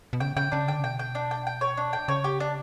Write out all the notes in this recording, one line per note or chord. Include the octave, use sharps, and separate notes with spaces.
B2
C#3 G5
C#3 G5
C#3 D4
D3 G5
C#3
B2 G5
G5
D4
G5
G5
C#5
D4
G5
C#3 C#5
G4
D4